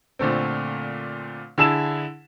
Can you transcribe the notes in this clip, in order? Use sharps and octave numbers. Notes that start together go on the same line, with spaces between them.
A#2 D3 A3 C4
D3 E4 G#4 A5 E6 E7